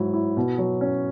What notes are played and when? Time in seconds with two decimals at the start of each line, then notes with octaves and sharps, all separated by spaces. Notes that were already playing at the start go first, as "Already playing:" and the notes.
Already playing: G#2 F#3 E4
0.13 E4
0.37 B2
0.58 F#3
0.81 C#4